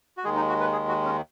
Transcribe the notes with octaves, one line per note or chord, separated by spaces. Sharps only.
F#4
D#2 D#3 G#3 G#4
D#4
F#4
B4
G#4
F#4
C#4